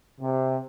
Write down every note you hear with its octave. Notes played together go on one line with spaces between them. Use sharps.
C3